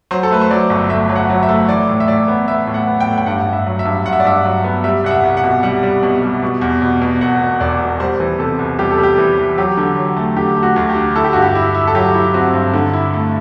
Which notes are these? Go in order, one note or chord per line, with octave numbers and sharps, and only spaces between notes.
F#3 C5
A4
A3 B4
C5
F#3 D5
G1
A3 E5
F#3
F#5
F#3
E5
A3
E3 D5
A2
E5
A2 D5
B3
B3 E5
A2
F#5
B3
G5
A2
G5
G2 F#5
G2
E5
F#3
E5
G2
G2 F#5
E5
D5
G2 E5
F#3
B3
G3 E5
C2 F#5
E5
C2
F#5
B2
G3 F#5
G3
B2
G3
B2
E2
B2
B2
E1 F#5
B2
E1 D5
B2
G3 C5
E3
C3 A4
C2
G3 G4
A4
G3
G4
E3
E3
F#3 G4
D3
F#3
A3
D3 G4
A3
F#4
D2
G4
D3
E4 A4
G4
G2 F#4
G4
E4
E4
A4
F#3 G4
E4
C4 F#4
G2
D3
E4
A3